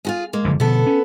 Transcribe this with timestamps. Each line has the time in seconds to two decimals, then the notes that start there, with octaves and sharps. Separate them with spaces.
0.05 F4 F#4 G#4
0.33 G#3 A#3
0.45 F#1 D3 F3
0.60 B2 D3 F3 B3 A4
0.86 C#4